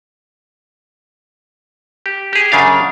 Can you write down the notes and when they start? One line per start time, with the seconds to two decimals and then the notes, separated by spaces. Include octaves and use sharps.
2.06 G4
2.33 G4 G#4
2.52 F#2 C#3 D4 F5